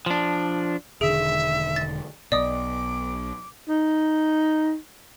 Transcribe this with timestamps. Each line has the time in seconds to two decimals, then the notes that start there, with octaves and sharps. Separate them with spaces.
0.06 F3 D4
1.01 E1 D3 D#3 G#4 E5 D7
1.76 A6
2.32 B1 B2 D5 D#5 D6 D#6
3.69 D#4